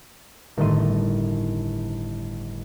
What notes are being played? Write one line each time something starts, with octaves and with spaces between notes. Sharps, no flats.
G1 A2 D#3 A3 C6 D#7